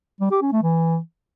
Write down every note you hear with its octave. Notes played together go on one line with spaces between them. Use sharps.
G3
G4
C#4
A3
E3